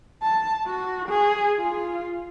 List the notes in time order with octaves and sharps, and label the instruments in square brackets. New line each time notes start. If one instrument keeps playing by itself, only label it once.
[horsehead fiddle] A5
F#4
G#4
F4